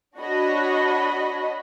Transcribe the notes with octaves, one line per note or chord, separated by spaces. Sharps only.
D4 F#4 C#5 D#5 B5